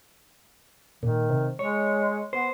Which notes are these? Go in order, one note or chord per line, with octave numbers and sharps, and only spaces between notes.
A#2 D#3
C3
G#3 C#5
B3 C5